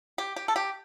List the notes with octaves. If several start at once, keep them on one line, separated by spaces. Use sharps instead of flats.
G4
G4
A4
G4